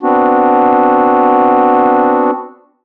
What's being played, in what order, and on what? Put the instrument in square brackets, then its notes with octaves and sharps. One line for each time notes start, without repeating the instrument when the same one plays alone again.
[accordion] B3 C4 D4 F#4